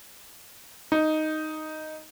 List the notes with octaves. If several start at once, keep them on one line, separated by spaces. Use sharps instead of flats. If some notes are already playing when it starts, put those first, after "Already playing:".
D#4